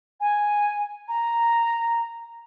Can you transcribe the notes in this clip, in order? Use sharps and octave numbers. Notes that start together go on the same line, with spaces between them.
G#5
A#5